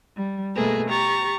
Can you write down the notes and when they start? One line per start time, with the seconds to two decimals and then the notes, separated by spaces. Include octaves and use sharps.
0.16 G3
0.55 B2 A3 A#3 G#4 A4 B4
0.89 G4 A#5 C#6 A6